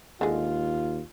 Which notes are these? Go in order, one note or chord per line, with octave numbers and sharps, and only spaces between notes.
D#2 D3 G#3 F4